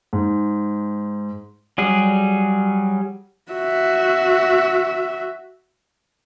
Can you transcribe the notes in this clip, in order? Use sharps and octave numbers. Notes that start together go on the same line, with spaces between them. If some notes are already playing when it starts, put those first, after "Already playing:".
G#2
F#3 G3 G#4
F#4 E5